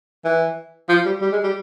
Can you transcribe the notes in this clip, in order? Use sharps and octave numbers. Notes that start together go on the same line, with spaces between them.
E3
F3
G3
G3
G#3
G3